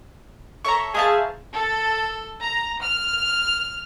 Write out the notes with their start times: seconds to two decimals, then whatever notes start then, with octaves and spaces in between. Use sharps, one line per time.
0.65 A4 C#5 E5 A#5 C#6
0.95 G#4 C5 E5 F5 A5
1.53 A4
2.42 A#5
2.83 F6